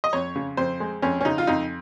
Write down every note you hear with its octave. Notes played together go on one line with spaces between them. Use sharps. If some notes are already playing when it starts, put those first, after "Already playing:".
D#5
F2 C#5
C#3
F2 C5
G#3
F2 C#4
C#4
C#3 D#4
F4
F2 D#4